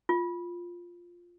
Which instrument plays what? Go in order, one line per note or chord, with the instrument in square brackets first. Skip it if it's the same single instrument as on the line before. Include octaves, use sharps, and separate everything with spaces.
[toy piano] F4